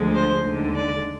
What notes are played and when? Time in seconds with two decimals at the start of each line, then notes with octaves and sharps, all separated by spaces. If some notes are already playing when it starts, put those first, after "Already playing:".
Already playing: D2 D3 F3 G#3
0.16 C5
0.46 D#2 D3 G#3
0.75 D5